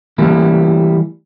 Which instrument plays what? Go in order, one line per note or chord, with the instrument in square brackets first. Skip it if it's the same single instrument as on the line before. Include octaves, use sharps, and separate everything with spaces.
[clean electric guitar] E3 G3 A3 A#3 E4